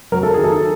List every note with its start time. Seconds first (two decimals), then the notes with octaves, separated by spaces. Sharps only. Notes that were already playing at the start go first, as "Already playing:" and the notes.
0.12 F#3 A#4
0.23 A4
0.34 D#3 G#4
0.44 A4